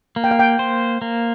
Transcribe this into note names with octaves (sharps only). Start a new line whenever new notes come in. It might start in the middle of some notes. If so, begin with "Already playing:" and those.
A#3
G5
F5
G5
C5
A#3